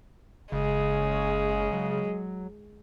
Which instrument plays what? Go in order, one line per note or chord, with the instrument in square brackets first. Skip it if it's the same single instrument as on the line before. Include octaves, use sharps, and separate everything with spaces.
[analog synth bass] F#1 [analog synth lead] C#3 [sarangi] G#3
[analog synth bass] F#3